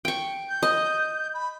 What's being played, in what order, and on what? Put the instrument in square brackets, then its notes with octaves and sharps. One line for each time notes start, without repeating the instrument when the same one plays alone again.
[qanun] G5 C#6
[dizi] G6
[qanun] D#5
[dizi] B5